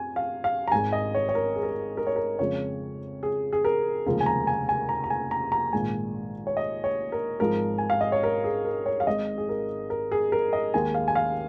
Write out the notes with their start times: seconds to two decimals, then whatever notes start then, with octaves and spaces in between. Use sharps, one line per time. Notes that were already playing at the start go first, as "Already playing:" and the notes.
Already playing: F2 G#5
0.16 F5
0.44 F5
0.68 A#5
0.72 G#1 G#2 G#3 G#5
0.93 D#5
1.15 C#5
1.29 C#5
1.35 A#4
1.56 G#4
1.63 A#4
1.70 G#4
1.97 A#4
2.07 C#5
2.16 A#4
2.39 F2 C#3 F3 G#3 C#5
3.23 G#4
3.53 G#4
3.65 A#4
4.06 F1 D#2 C#3 F3 G#3 A#4
4.21 G#5
4.26 A#5
4.47 G#5
4.69 G#5
4.89 A#5
5.04 A#5
5.10 G#5
5.31 A#5
5.52 A#5
5.73 A#1 G#2 D#3 G#3 G#5
6.47 C#5
6.57 D#5
6.84 C#5
7.12 A#4
7.40 G#1 G#2 F3 G#3 A#4
7.78 G#5
7.90 F5
8.01 D#5
8.12 C#5
8.23 A#4
8.44 G#4
8.65 A#4
8.86 C#5
9.00 F5
9.07 G#1 G#2 G#3 D#5
9.38 G#4
9.49 A#4
9.90 A#4
10.12 G#4
10.32 A#4
10.53 D#5
10.73 D#2 D#3 G#3 G#5
10.94 F5
11.08 G#5
11.15 F5